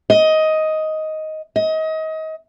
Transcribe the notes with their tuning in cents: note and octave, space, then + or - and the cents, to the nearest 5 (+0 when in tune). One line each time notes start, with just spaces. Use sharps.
D#5 +10
D#5 +30